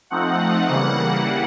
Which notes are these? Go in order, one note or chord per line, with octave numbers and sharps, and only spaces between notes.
F3 A3 C4 D#4 F#5
C#3 E3 G3 A#3